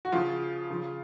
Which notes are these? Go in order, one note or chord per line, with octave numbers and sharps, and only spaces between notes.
F#4
C#3 F3 F4
C#3 F3